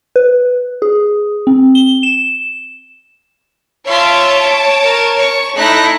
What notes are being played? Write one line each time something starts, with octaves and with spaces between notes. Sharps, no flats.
B4
G#4
C4
G7
E7
F4 C#5 E5 A5 D7
A#4
C#6
A3 D#4 E4 F#6 A#6